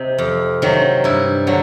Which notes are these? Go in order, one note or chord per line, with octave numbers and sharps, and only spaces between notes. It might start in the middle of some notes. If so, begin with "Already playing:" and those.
Already playing: C3 D#4
F2
C3 D#3 F#3
G2 E4
D3 F#3